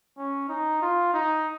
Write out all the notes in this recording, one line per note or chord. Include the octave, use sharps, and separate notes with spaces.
C#4
D#4
F4
D#4